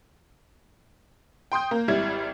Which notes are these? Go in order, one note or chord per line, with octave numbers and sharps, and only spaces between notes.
G5 C6 D#6 G6
A#3
G#1 G3 E4 G#6